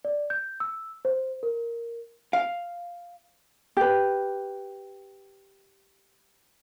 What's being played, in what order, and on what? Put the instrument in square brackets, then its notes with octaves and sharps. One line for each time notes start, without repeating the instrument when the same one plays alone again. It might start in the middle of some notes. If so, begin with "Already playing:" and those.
[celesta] D5
G6
E6
C5
A#4
[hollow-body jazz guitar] F5
[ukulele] G4 B4